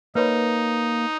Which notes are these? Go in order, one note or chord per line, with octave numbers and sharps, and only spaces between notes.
A#3 D#4 B4 C#5 B5